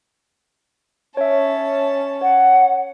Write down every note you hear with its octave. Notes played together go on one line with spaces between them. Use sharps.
C#4 C#5 E5 A5
C#5 F#5